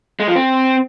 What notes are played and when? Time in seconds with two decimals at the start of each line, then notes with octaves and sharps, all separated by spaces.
0.20 G#3
0.28 F3
0.36 C4